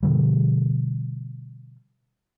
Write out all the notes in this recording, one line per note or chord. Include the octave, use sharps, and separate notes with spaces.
B2 D3 F3 G3